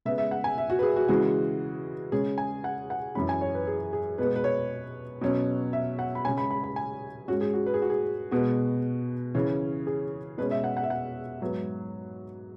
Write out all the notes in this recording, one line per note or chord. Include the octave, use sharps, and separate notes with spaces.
C#3 G#3 B3 E5
E5
F#5
G#5
E5
F#4
B4
G#4
F#4
C#3 E3 G#3 F#4
C#3 G#3 C#4 G#4
G#5
F#5
F#5
F#2 E3 C#4 B5
G#5
C#5
B4
G#4
G#4
B2 G#3 B3 B4
B4
C#5
B2 F#3 C#4
E5
F#5
B5
C#3 G#3 C#4 G#5
B5
B5
B5
G#5
G#2 G#3 C#4 F#4
G#4
F#4
B4
G#4
F#4
G#4
B2 G#3 B3 F#4
C#3 E3 C#4
G#4
B2 G#3 C#4 B4
E5
F#5
F#5
E5
F#5
G#2 F#3 B3